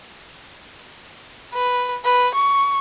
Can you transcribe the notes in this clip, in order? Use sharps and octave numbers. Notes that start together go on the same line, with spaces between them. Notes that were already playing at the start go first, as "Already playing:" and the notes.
B4
B4
C#6